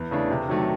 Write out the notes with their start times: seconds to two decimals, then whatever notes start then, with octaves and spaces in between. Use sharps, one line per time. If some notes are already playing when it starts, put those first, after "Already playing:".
Already playing: E2
0.11 C#3 E3 A3 D4
0.30 C3
0.49 D#3 F#3 A3